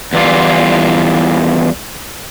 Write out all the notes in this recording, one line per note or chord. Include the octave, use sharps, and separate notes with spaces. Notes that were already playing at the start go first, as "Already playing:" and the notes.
E2 E3 G3 F4